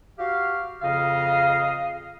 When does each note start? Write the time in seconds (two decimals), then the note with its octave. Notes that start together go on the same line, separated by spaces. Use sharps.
0.19 F#4 G4 F5
0.82 F2 C#3 D#5 F5